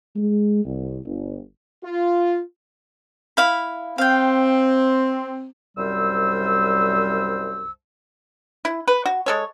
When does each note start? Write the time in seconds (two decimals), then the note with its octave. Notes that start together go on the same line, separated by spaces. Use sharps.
0.16 G#3
0.64 C2
1.06 G1
1.84 F4
3.37 E4 F5 B5
3.98 C4 F5 G5
5.78 C2 F#2 G3 C5 E6
8.65 E4
8.88 B4
9.06 F#4
9.26 G#3 A4 C#5